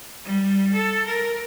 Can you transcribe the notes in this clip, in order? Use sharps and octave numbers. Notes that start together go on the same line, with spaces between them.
G3
A4
A#4